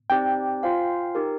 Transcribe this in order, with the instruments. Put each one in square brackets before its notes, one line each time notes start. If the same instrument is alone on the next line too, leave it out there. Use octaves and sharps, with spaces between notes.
[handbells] C4 D#4 G4 D5 [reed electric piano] G5
[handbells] F4 C5 F5 G#5
D#4 G4 A#4